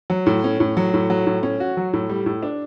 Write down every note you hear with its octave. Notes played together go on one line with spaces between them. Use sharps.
F#3
A2
C#4
A2
F#3
A2
F#3
A2
C#4
F#4
F#3
A2
G3
A2
D4